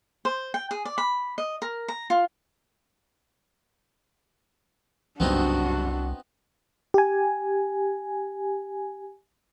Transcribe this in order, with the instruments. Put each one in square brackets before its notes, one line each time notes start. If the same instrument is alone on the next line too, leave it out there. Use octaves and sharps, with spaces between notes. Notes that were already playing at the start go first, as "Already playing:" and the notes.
[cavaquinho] C5
G5
G#4
D5
B5
D#5
A#4
A#5
F4
[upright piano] F#1 G2 [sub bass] C2 [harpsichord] B3 C4 D#4 [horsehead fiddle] D4 F#4
[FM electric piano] G4 G#5